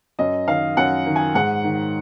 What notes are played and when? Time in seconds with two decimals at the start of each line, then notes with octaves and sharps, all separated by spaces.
0.19 F#2 D#5
0.48 D#3 F5
0.77 F#2 F#5
1.06 D#3
1.16 G#5
1.35 G#2 F#5
1.64 D#3